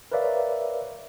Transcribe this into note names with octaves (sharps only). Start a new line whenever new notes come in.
A#4 B4 C#5 D5 E5 F5